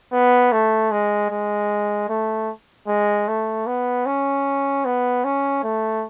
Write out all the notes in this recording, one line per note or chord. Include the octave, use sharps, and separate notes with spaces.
B3
A3
G#3
G#3
A3
G#3
A3
B3
C#4
B3
C#4
A3